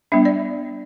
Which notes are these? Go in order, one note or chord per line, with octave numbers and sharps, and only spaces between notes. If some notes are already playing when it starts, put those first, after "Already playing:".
G3 B3 D4 E5
D5